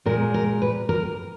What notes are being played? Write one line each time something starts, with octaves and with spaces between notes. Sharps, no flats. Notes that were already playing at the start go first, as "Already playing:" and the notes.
A#2 G#3 A#4
A#4
B4
A#4